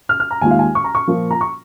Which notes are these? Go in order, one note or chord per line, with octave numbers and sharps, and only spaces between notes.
F6
F6
A#5
D#2 D#3 G#3 F4 G#5
F5
G#5
C#6
A#5
C#6
A#2 F3 A#3 F4
A#5
C#6